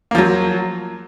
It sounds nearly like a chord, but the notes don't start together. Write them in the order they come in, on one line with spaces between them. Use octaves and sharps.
A#3 F3 F#3